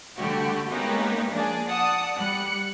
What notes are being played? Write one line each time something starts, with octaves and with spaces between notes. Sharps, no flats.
D3 G3 A3 F#4 G4
G#3 A#3 B3 C#4 D#4 G4
F3 A#3 D4 G#4
D5 F#5 A5 D#6
G3 F#6 C#7